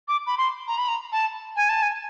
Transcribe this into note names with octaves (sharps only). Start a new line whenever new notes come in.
D6
B5
C6
A#5
B5
A#5
A5
G#5
A5
G#5